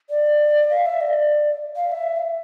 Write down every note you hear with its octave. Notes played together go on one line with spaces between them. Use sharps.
D5
F5
E5
D5
F5
E5